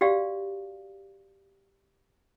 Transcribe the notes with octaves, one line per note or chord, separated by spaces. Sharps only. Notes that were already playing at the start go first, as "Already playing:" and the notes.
F#4 G4 D5 F5